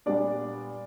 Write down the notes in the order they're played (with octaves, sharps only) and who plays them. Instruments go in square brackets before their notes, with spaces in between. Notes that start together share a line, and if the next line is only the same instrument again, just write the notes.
[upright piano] A#2 G3 B3 D4 D5